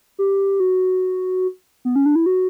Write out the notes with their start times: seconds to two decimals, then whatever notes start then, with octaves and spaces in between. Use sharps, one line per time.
0.19 G4
0.60 F#4
1.85 B3
1.96 C#4
2.06 D4
2.15 E4
2.26 F#4